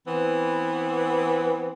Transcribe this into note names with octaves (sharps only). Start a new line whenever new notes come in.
E3 B3 C4 B4